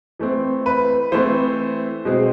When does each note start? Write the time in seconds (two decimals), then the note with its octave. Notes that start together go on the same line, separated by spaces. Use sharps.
0.19 E3 A3 C4
0.66 B4
1.12 E3 A3 C4 C5
2.05 B2 G#3 C4